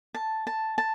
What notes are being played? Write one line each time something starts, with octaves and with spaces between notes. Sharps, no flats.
A5
A5
A5